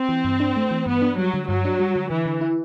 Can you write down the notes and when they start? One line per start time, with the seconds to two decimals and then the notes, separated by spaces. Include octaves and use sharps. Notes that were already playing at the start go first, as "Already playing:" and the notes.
Already playing: C4
0.09 E3
0.24 G2
0.40 D4
0.56 A3
0.71 E3
0.86 G2 B3
1.02 D4
1.17 F#3 G3
1.34 D3
1.48 G2 F#3
1.65 D4
1.79 G3
1.96 D3
2.10 D3 E3
2.26 D3
2.41 E4